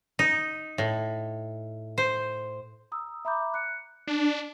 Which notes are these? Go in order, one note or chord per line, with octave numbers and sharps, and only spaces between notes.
D#4
A2
C5
A#5 D#6 E6
E5 A#5 B5 D6 G6
F#6 C#7
D4